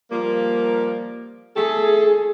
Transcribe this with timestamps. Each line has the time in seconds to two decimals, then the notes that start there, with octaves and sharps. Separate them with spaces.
0.11 F3 G3 A#3
1.56 A3 G#4 A4